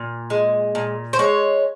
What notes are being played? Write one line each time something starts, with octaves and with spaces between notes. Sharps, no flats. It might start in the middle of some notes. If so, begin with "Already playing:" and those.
Already playing: A#2
G#3
A#2
C5
G#3 C#5